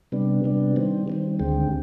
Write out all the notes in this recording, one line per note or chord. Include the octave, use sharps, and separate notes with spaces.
C3 G3 B3 D4
C3 G3 B3 D4
D#3 G3 C4
D#3 G3 C4
D2 D3 G#3 C4 G4